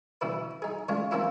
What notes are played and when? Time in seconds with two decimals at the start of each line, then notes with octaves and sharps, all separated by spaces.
0.21 B2 D3 E4 B4
0.62 D#4 G#4
0.89 C#3 G#3 A3 D4 F4
1.11 F3 A#3 C4 C#4 E4 F4